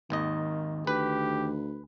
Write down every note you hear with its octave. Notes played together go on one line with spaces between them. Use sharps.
G#1 D#2 D#3 D#5
D2 D#3 G4 B4